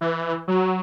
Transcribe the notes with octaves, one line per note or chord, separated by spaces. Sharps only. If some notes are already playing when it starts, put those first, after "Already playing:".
E3
F#3